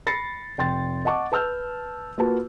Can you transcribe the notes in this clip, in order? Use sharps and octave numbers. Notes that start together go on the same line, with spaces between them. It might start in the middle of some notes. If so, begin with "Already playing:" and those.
B5 A6 A#6 C7 C#7
F1 G5 C6 A6
D#5 F#5 A5 C#6 D6
B4 A5 E6 F6 G6
A#3 F4 F#4 B4 A5